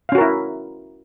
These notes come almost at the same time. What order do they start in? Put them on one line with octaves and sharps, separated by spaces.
F5 C#4 F#4 A#4 E4